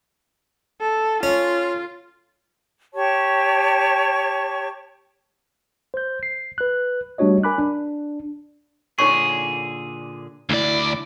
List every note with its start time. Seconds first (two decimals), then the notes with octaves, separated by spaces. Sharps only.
0.81 A4
1.23 C#4 F4
2.94 G4 C#5 A5 C#6
5.94 C5 G6
6.23 C7
6.58 B4 F#6
7.18 G3 A3 D4 F#4 C#5 D#5
7.43 A#4 G#5 B5 D6 F#6
7.58 D4
8.99 A#2 D3 D#4 G#4 C#5 C#6
10.49 D2 E4 D5 D6